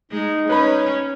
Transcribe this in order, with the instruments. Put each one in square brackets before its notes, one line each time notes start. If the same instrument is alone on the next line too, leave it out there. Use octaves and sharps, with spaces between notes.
[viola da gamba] G#3 [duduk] D#4
[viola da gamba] C#4 [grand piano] B4 C#5 B5